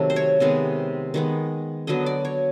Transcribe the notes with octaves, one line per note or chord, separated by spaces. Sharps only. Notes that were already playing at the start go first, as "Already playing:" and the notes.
Already playing: C3 D#3 F#3 A3
C5
C#5
C3 D#3 G#3 B3
D#3 G#3 B3
D3 F#3 B3 D#5
D5
C#5